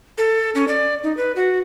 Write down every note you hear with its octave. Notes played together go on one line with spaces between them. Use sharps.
A4
C#4
D5
D#4
B4
F#4